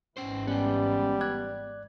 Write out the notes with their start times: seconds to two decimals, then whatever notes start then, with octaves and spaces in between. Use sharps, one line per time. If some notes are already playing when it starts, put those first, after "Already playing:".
0.17 G#1 G#2 E3 C#4 C5
0.47 G3 B3 C#4 G4
1.21 D5 F#6 G#6